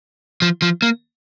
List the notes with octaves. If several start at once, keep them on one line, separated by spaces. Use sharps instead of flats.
F3
F3
A#3